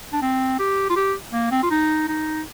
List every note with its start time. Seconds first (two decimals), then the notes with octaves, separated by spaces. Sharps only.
0.13 D4
0.22 C4
0.59 G4
0.90 F4
0.96 G4
1.33 A#3
1.51 C4
1.63 F4
1.71 D#4
2.08 D#4